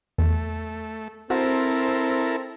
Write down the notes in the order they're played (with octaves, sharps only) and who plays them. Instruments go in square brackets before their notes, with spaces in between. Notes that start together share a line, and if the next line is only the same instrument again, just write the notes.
[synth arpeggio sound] E2 [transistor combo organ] A3
[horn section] C4 [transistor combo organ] E4 A4 A#4 [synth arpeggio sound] F#4